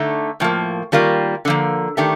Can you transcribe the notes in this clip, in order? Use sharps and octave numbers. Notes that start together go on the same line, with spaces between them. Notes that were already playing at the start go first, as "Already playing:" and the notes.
Already playing: D3 A3 D#4
A2 F3 A#3
D#3 G3 A#3 F4
D3 F3 A#3
D#3 A3 D4 G4